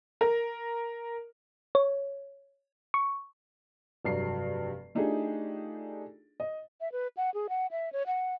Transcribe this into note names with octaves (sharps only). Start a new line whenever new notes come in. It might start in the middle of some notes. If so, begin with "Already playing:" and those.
A#4
C#5
C#6
F1 G2 F#3 C7
A3 D4 D#4 F4 G4 G#4
D#5
E5
B4
F#5
G#4
F#5
E5
C#5
F#5